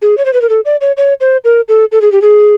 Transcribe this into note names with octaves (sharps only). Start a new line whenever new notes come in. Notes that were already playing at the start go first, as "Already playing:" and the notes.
G#4
C#5
C5
B4
A#4
A4
D5
C#5
C#5
C5
A#4
A4
A4
G#4
G4
G#4